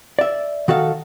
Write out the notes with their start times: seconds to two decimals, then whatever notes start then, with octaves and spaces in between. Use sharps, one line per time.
0.19 D5 E5
0.68 D#3 F#4 A4 F5